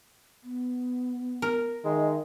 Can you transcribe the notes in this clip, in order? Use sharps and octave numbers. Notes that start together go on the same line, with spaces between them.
B3
A#4
D#3 G#3 E5